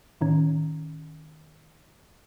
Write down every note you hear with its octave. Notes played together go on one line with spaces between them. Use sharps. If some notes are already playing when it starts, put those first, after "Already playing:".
A2 D#3 C#4